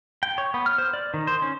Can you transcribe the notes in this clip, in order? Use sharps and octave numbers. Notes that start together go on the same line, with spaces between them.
G5
C#5
B3
F6
C5
D5
D#3
C5
C#4